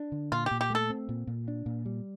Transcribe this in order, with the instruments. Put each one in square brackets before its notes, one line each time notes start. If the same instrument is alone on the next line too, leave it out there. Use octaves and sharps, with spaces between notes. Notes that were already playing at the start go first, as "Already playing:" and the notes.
Already playing: [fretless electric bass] D4
D3
[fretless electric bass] A#2 [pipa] F4
[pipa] G4
[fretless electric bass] A#2
[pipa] G4
[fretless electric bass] A3 [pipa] A4
[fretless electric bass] C4
A#2
A#2
D4
A#2
G3